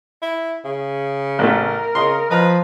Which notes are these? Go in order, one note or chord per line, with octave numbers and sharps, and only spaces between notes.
E4
C#3
A1 A3 A#4
C#3 D#5 C6
F3 B4 D#5 A#5 F6